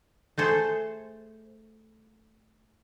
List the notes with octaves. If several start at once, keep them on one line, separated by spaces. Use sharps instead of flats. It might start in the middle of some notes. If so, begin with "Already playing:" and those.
A3 G#4 A4 C5